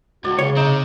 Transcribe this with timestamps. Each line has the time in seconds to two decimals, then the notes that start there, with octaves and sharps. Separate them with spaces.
0.24 C#2 F#4 D5
0.39 C#3 C#5
0.56 C3 C4 D#4